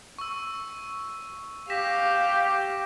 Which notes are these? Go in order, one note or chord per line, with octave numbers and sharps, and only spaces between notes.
C#6 E6
G4 F5 A#6 B6 E7